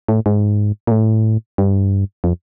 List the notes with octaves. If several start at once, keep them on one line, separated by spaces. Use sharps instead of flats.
A2
G#2
A#2
A2
G2
F2